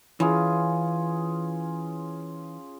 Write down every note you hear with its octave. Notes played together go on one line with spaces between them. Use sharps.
E3 C#4 F4 G#4